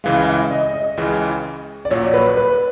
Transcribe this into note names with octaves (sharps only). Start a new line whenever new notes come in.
C#2 C#3 E3 G#3 F5
E5
D#5
D#5
C#2 C#3 E3 G#3
D5
A#1 A#2 F#3 C#5
B4
B4